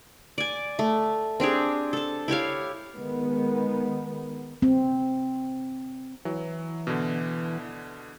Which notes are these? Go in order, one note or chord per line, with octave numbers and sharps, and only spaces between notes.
D5 G#5
A3
C4 D4 G4 G#4
A4 A5
E4 G4 C#5 F5
D#3 G#3 B3
C4
E3 F#3
B2 D3